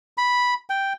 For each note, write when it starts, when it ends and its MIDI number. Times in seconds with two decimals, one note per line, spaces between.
0.18 0.54 83
0.70 0.93 79